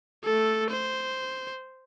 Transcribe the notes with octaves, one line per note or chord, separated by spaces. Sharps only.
A3 A4
C5